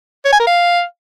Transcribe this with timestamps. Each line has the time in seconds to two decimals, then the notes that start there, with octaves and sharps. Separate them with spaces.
0.25 C#5
0.32 G#5
0.39 A#4
0.47 F5